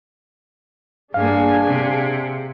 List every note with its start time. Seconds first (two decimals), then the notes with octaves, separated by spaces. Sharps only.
1.14 G2 A#3 D4 G#4 F5 G#5
1.64 C3